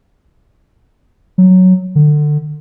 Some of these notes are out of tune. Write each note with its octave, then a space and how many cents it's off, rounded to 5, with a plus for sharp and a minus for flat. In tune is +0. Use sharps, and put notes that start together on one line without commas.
F#3 +0
D3 +25